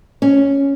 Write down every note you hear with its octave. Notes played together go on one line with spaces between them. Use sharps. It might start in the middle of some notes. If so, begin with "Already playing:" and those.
C#4